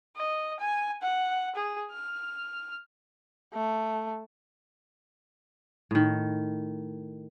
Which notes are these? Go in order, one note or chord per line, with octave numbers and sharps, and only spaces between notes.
D#5
G#5
F#5
G#4
F6
A3
A2 D#3